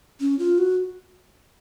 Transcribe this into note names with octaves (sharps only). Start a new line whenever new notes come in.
C#4
F4
F#4